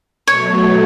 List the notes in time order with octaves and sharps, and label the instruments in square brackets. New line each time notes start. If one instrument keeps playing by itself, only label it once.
[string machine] B2 F#3 A3 [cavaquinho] C#5